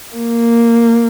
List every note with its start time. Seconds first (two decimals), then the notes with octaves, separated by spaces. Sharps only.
0.16 A#3